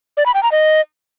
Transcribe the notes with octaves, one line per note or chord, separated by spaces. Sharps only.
D5
B5
G5
A#5
D#5